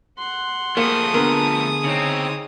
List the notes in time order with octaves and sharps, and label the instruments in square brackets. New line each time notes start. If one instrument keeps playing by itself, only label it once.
[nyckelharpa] F#5 C6
[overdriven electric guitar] F3 A3 [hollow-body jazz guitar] A#3 [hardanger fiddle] G#4 D#6
[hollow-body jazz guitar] D3 B3 A#4
[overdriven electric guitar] C#3 C4 [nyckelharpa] D#4 C#5